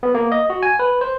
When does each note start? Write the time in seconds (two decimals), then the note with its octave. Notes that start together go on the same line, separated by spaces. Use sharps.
0.03 B3
0.15 A#3
0.32 D#5
0.50 F#4
0.63 G#5
0.79 B4
1.01 C5